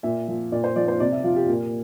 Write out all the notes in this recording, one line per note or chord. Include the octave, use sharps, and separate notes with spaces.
A#2 E5
F3
A#2 D5
C5
F3 D5
C5
C3 D5
E5
F3 F4
G4
A#2 A#4